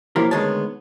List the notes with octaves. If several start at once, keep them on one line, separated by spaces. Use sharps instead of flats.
F3 F#3 A#3 E4 G4 A#4
D2 D#3 G#3 B3 C#5 A5